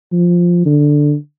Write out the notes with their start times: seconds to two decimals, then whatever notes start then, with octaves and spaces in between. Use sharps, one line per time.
0.12 F3
0.66 D3